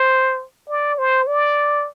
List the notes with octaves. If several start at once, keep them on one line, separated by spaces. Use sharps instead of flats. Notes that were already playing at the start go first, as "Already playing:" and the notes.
Already playing: C5
D5
C5
D5